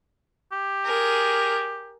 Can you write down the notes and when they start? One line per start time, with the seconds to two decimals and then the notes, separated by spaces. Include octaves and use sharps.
0.52 G4
0.85 G#4 A#4